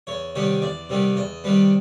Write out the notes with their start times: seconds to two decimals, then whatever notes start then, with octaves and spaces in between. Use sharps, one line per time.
0.07 E2 C#5
0.35 C3 D#3 G3 B3 C#5
0.62 E2 D5
0.90 C3 D#3 G3 B3
1.16 E2 D#5
1.44 C3 D#3 G3 B3